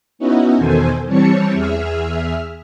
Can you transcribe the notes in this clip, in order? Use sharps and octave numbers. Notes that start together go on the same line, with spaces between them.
B3 C#4 D#4 E4 F#4
E2 B2 D#3 A4 C5 G#5
E3 G3 C4 C#5 A5 C#7
E2 G#4 E5 F6